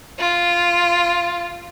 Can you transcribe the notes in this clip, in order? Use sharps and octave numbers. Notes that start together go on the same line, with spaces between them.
F4